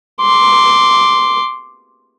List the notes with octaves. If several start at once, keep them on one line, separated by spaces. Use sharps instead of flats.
C6 D6